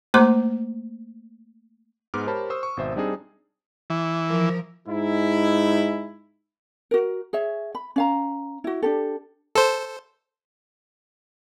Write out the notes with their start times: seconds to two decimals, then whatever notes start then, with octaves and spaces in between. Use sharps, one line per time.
0.14 A3 A#3 C5 A#5 C6 D6
2.14 G#2 G#3 B3 D6 F6
2.27 G4 A#4 C5 C#5 A5 B5
2.50 C5 C#6 D#6 E6
2.63 C#6
2.77 G#1 B2 C5 E5
2.96 G3 C4 D4 D#4 G#4
3.90 E3
4.29 F3 A#4
4.87 G#2 G#3 D#4 E4
6.91 F#4 A#4
7.33 G#4 C#5 E5
7.75 B5
7.96 C#4 F5 A#5
8.64 E4 F#4
8.82 D4 G4 A4
9.55 A4 C5